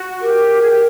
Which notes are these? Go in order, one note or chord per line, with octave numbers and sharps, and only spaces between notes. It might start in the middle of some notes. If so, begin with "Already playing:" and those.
Already playing: F#4
G4 A#4
G#4
G4